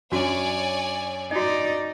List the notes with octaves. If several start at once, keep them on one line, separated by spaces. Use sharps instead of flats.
F#2 D4 F#4 C#5 D5 G#5
D#4 F#4 D5 D#5